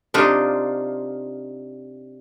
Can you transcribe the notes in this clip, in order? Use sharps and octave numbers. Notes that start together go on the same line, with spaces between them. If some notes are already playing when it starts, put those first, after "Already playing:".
C3 D4 D#4 F4